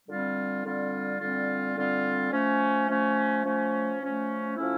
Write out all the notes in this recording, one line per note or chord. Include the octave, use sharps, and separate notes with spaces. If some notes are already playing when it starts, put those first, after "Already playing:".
D3 G3 C4 F4
D3 G3 C4 F4
D3 G3 C4 F4
D3 G3 C4 F4
F3 A3 C#4
F3 A3 C#4
F3 A3 C#4
F3 A3 C#4
F3 A3 C#4 E4